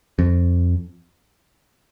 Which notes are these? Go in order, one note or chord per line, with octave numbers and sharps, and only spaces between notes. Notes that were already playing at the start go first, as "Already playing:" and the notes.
F2